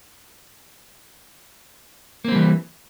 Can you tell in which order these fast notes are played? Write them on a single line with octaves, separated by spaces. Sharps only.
A#3 C4 G3 E3